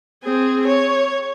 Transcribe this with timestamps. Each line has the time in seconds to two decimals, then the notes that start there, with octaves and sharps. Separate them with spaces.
0.24 C4 G#4
0.67 C#5